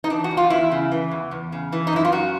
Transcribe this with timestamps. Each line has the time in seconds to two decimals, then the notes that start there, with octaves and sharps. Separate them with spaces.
0.04 D#4
0.10 E3 D4
0.24 F#4
0.31 E2
0.37 F4
0.50 E2 E4
0.72 C#3
0.92 E3
1.11 E2
1.31 E2
1.52 C#3
1.73 E3
1.87 D#4
1.93 F#2 E4
2.05 F4
2.12 F#2 F#4